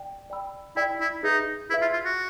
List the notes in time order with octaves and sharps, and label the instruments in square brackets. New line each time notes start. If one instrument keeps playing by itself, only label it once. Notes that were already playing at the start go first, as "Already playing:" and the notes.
Already playing: [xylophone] D5 G5
D5 G5 B5 E6
[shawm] E4 [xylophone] D5 G5 B5 E6
[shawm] E4
[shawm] D#4 [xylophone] G#4 B4 E5
[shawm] E4 [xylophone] G#4 B4 E5
[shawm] F4
F4
F#4